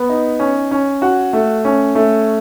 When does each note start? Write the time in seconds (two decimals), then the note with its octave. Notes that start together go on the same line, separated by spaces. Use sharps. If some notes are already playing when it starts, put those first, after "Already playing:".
Already playing: B3
0.09 D#4
0.40 C#4
0.71 C#4
1.02 F#4
1.33 A3
1.65 C#4
1.95 A3